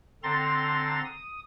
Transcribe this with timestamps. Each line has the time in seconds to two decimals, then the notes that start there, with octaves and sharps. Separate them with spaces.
0.23 D3 C4 A4 A#5 C6 A6
1.04 D#6